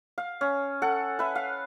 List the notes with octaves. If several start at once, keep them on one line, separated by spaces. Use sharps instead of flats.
F5
C#4
A4 F#5
B4 E5
F5